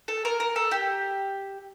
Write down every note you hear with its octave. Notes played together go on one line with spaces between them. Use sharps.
A4
A#4
A#4
A4
G4